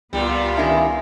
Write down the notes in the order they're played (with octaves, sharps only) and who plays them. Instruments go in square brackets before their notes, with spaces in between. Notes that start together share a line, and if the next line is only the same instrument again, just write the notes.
[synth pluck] C#2 [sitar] A#2 G3 [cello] B3 F4
[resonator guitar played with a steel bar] D#3 E4 [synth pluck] C#4 D4 G#5